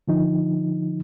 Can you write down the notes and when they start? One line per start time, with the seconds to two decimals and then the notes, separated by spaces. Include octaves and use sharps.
0.08 D3 F3 D#4